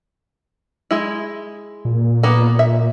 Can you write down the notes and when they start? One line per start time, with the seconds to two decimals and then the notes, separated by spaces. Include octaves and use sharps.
0.91 G#3 E4
1.85 A#2
2.23 A#3 B3
2.59 E5